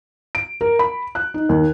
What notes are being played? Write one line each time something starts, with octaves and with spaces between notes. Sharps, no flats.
D7
A#4
B5
F#6
D#4
D#2